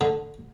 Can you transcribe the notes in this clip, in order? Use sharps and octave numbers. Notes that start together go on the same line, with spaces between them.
D3